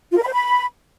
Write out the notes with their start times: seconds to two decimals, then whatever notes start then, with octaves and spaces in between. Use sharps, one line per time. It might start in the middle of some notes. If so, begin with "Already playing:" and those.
0.12 F4
0.17 A#4
0.22 B5
0.27 C5
0.33 B5